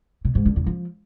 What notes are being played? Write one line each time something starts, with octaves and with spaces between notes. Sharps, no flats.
B2
G#2
D3
E2
F3